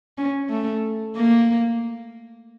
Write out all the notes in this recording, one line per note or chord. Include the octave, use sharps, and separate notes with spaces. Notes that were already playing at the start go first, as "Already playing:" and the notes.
C#4
A3
A#3